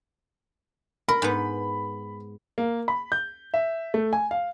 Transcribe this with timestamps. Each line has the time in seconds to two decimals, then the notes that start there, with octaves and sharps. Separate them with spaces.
1.08 A#4 B5
1.22 G#2 B3
2.58 A#3
2.88 B5
3.12 G6
3.54 E5
3.94 A3
4.13 G#5
4.31 F5